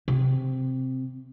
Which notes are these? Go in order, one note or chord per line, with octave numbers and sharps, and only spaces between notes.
C3